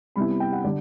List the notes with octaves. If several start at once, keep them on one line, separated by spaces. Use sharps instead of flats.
C3 G3 B3 E4 B5
G5
F#5
D3 G3 D5